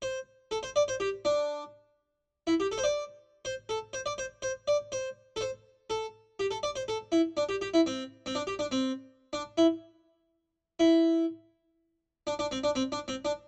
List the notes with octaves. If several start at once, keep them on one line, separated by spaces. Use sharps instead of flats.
C5
A4
C5
D5
C5
G4
D4
E4
G4
A4
C5
D5
C5
A4
C5
D5
C5
C5
D5
C5
A4
C5
A4
G4
A4
D5
C5
A4
E4
D4
G4
G4
E4
C4
C4
D4
G4
D4
C4
D4
E4
E4
D4
D4
C4
D4
C4
D4
C4
D4